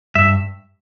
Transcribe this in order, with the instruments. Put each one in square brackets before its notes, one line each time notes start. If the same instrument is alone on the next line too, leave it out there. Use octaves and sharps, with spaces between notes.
[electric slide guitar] G2 [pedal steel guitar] E5